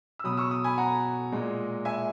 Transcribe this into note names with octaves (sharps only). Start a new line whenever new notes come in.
E6
B2 F#3 B5 D#6
C#6 E6
B5 D#6
G#5 B5
F#5 A#5
A#2 G#3
E5 G#5